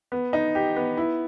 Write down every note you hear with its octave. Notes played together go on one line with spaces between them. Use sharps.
B3
D#4
G4
B3
E4